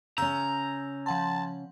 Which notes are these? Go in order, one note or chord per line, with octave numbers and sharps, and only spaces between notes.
C#3 C#4 A#5 E6 G6
F3 F#5 A5 C6